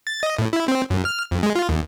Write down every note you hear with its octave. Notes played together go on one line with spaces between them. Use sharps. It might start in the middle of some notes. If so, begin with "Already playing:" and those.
A6
D#5
A2
E4
C4
F#2
F6
F2
G#3
F4
D#2